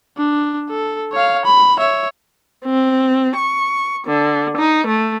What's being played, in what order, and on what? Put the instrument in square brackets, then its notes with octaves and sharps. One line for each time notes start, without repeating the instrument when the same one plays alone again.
[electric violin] D4
A4
C#5 F5
B5
C#5 E5
[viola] C4
C#6
D3
D#4
A3